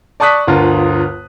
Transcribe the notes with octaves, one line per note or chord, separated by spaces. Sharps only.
D5 A5 C#6 D#6 F#6 B6
G1 D2 F4 A#4